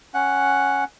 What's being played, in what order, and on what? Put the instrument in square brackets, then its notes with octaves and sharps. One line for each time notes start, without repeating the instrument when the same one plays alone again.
[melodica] C#4 F#5